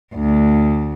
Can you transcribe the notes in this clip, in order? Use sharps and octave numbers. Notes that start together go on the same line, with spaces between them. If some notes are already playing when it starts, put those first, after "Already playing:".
D2